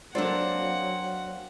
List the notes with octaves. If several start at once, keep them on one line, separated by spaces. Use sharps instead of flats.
F#3 A#3 C4 D4 A4 D5 F#5